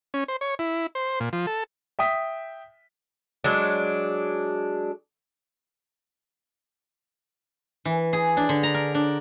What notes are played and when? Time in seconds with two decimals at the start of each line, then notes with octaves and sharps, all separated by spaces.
0.14 C#4
0.28 C5
0.41 C#5
0.59 E4
0.95 C5
1.20 A#2
1.33 F3
1.47 A4
1.99 E5 G5 D#6 B6
3.44 F#3 G#3 D4
7.85 E3
8.13 G#4
8.37 D4
8.49 D3
8.63 A#5
8.74 A#4
8.95 D4